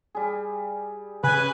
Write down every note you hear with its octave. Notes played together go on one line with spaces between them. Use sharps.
G3 G#4
C#3 B4 G#5